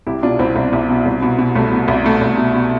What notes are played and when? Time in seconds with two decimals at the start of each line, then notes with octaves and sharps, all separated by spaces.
0.07 C2 E4 G4
0.23 B2 D4 F4
0.39 C2 C4 E4
0.56 C2
0.73 C2
0.89 B2
1.06 C2
1.22 B2
1.39 B2
1.55 C2 A3
1.71 B2
1.88 C2
2.04 B2 A3
2.21 C2
2.37 B2
2.55 B2